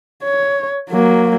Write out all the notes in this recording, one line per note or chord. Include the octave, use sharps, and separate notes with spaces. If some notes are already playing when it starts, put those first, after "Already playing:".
C#5
F#3 A#3